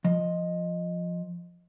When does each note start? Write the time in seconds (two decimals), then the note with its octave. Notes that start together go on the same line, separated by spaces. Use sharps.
0.04 F3 D#5